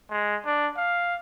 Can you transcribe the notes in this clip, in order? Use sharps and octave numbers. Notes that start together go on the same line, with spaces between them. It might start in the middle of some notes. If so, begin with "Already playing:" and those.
G#3
D4
F5